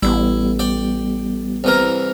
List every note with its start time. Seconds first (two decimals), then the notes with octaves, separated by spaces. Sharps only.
0.03 A1 G3 B3 E4
0.59 D5 G5
1.64 C2 E3 A#4